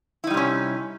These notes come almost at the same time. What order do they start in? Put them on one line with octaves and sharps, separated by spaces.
E4 D#4 G3 C3 C#4